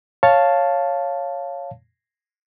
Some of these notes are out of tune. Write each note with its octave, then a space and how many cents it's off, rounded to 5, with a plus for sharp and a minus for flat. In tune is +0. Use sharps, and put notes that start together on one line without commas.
C#5 +0 F5 +0 A5 +0